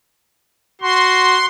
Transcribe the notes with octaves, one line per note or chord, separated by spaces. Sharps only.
F#4 C6